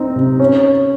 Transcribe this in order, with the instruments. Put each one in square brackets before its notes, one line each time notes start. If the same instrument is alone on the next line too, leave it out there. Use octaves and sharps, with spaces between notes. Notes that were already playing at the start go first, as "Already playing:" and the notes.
Already playing: [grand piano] C4 D#4
C3
C#4